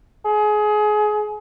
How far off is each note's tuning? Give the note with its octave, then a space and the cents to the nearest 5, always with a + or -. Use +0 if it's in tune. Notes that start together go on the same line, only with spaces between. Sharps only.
G#4 +25